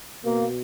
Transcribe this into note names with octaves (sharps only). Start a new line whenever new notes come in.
B2 A#3